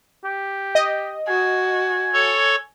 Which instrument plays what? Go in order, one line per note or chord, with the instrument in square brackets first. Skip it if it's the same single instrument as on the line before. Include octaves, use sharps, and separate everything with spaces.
[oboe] G4
[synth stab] D#5
[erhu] F#4 [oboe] G#5
[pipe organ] A4 C#5 C#6